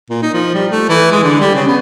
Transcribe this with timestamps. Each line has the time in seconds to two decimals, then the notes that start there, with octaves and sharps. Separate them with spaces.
0.10 A#2
0.22 D#4
0.34 F3
0.54 G3
0.71 A3
0.89 E3
1.11 G#3
1.24 D3
1.40 G3
1.55 C#3
1.67 B3